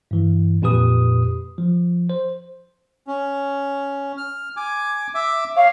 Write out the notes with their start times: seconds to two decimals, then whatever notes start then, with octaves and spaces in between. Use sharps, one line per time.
0.11 G2 E3
0.62 F2 A#2 G4 B4 D#6
1.58 F3
2.10 C5
3.07 C#4
4.17 F6
4.57 G#5 D6
5.15 E5 D6
5.56 C#5 F5